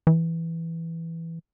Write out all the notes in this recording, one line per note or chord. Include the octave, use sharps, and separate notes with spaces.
E3